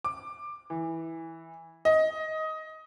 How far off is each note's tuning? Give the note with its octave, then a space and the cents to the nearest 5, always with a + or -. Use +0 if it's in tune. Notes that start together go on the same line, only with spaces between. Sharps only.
D6 +15
E3 -10
D#5 +15